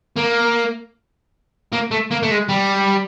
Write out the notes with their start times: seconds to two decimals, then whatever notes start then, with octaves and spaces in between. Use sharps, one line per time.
0.17 A#3
1.73 A#3
1.91 A3
2.11 A#3
2.23 A3
2.31 G#3
2.49 G3